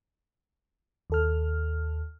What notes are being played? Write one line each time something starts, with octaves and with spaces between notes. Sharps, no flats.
D#2 A4 F6